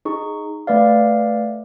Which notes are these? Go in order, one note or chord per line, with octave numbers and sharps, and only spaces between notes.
D#4 G#4 C#6
A3 B4 D5 F5